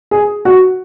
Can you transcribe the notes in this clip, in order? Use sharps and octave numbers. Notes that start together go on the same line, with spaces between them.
G#4
F#4